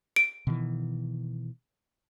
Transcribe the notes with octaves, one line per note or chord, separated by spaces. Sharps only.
D7
B2 D#3 E3